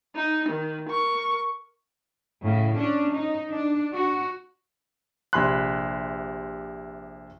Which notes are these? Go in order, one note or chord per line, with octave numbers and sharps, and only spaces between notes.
D#4
D#3
A#4 C#6
A2 C#3
C#4 D4
D#4
D4
F#4
A#1 C3 G#5 B5 C6 F#6